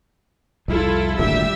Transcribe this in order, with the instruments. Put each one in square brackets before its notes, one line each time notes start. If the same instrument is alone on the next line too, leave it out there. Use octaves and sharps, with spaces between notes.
[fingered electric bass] C2 F2 [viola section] E4 F4 A4
[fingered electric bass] G#1 D2 A#2 [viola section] G3 G4 E5